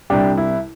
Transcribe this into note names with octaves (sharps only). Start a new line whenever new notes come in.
C2 C3 G3 D4 G4
E4